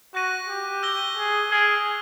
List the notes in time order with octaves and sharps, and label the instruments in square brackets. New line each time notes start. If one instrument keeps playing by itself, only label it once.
[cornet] F#4 [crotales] C#6 F#6 A#6 D#7
[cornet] G4
[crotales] E6 G6 A#6 D#7 G7
[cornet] G#4
[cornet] G#4 [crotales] F6 A#6 D7 F7